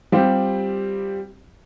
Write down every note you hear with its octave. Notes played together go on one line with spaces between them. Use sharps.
G3 C4 F4 G4